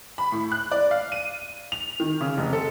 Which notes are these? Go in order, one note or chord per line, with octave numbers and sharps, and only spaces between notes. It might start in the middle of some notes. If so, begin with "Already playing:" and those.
B5
A2
F#6
D5
F5
D#7
F7
D#3
C#3
F1
A4